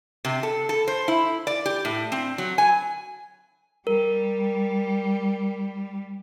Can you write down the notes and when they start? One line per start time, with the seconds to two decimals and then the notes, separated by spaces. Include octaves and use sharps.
0.25 C3
0.43 A4
0.69 A4
0.88 C5
1.08 E4
1.47 D5
1.66 G4
1.85 A2
2.12 C4
2.38 F#3
2.58 G#5
3.87 G3 A#4